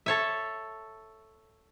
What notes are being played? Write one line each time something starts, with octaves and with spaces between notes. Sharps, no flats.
A4 C#5 E5